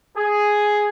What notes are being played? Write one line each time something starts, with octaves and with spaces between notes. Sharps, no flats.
G#4